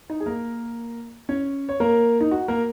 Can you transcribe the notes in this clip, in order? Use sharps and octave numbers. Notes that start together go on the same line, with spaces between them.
D#4 D#5
G#4
A#3 A#4
C#4 C#5
C#5
A#3 A#4
D#4
F#4
A#3 A#4